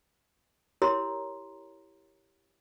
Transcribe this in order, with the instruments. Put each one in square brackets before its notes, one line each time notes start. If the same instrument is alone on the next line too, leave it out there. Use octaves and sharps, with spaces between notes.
[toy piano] E4 G4 A#4 C#5 A#5 C6